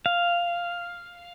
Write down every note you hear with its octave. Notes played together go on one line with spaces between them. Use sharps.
F5